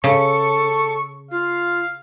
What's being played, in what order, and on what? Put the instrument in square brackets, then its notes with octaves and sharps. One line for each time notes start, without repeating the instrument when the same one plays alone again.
[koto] C#3 [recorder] A4 [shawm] C#6
[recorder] F4 [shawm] F5